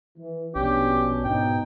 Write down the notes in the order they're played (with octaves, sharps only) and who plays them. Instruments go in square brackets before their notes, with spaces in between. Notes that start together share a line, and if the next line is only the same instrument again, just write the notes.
[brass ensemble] E3
[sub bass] A#1 [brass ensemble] B2 C#4 D4 [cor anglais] G4
[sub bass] G#2 [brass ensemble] B2 D#4 [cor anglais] G5